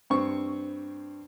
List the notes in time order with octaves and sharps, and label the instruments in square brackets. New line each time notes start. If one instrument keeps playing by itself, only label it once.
[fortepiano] G2 C4 C#6